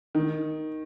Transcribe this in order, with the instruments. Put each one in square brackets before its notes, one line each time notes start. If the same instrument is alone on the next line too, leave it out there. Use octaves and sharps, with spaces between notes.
[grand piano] D#3